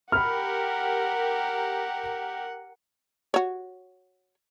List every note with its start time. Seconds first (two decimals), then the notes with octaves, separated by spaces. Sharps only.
0.12 G4 A#4 F#5 B5 F6
3.34 F#4 C#5